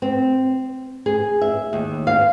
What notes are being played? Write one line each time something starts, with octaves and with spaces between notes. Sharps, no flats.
C4
G#4
E5
D#2
F5